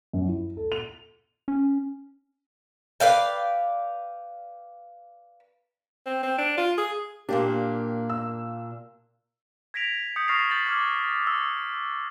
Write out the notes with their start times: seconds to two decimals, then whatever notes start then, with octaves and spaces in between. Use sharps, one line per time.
0.13 F#2
0.28 E4
0.57 A4
0.72 F7
1.48 C#4
3.00 B4 D5 F5 G5
6.06 C4
6.23 C4
6.38 D4
6.58 F4
6.78 G#4
7.29 A#2 A#3 D4 G4
8.10 E6
9.74 G#6 A#6 B6 D7 F7
10.16 D#6 G6 C#7
10.28 C#6 F6 A6 A#6 C7 F7
10.50 G6 A6 B6 C7 F#7
10.65 D6 F6 G#6
11.27 E6